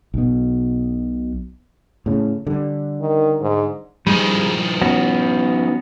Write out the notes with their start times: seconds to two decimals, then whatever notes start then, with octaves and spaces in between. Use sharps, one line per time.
0.14 B1 B2
2.06 A2 C#3
2.47 D3 G3
3.01 D#3
3.41 G#2
4.07 D#3 F3 G3 G#3
4.81 B3 C#4 F#4